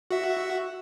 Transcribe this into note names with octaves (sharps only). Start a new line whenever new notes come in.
F#4 E5